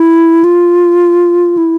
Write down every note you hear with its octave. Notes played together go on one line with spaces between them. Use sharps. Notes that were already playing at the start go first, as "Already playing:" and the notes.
Already playing: E4
F4
E4